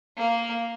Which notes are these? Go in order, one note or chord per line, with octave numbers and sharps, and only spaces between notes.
A#3